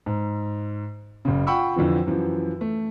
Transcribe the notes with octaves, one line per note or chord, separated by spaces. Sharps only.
G#2
F#1 C#3
F4 F#5 G5 B5 C#6 E6
F2 D3 E3 F3
F#2 E3 F3
A3